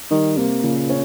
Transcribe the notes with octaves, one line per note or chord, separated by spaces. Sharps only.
D#3 G3
C3 A#3
A#2 C#3
C#4